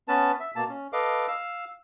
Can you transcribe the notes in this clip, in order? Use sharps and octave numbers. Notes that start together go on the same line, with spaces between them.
B3 C#4 B4 A5
E5
B2 A#3 A5
C#4
A4 B4 D#5 F5 D6
F5 E6